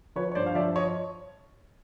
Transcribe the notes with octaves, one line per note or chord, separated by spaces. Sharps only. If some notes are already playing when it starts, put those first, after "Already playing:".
F3 B4 C#5
C#5
G2 C5 D5
F5
F3 D5 E5
C#5 D#5